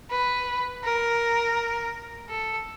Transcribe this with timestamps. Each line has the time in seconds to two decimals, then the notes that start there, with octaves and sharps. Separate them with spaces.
0.11 B4
0.84 A#4
2.29 A4